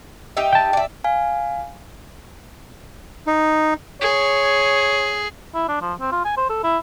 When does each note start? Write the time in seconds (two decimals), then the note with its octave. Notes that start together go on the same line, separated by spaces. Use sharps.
0.37 D#4 G4 E5
0.53 G5 A5
0.73 D5 E5
1.04 F5 G#5
3.27 D#4
4.01 G#4 C#5
5.55 E4
5.69 D4
5.82 F3
6.00 C4
6.12 F4
6.25 G#5
6.37 C5
6.50 A4
6.64 E4